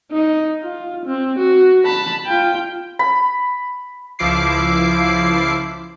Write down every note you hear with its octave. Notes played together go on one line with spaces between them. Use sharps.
D#4
F4
C4
F#4
A5 B5
F4 G5
B5
C#2 F3 E4 D6 C7